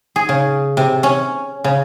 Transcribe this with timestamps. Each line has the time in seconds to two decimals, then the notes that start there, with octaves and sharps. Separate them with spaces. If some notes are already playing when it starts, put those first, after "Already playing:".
0.16 G#4
0.29 C#3
0.77 C3
1.03 C#4
1.64 C#3